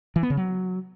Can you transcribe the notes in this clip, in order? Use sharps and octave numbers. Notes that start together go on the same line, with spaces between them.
E3
B3
C#3
F#3